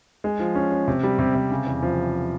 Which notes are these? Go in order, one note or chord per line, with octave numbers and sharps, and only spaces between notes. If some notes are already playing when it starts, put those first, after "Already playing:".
G#3
F3
C#4
C#4
C3
G3
C3
C3
C#3
E2
F3